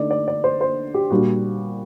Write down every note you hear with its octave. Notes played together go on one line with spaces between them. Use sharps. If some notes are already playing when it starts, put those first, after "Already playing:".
Already playing: D3 A3 D#4 D5
D5
D5
C5
C5
G4
A#2 G3 D4 F#4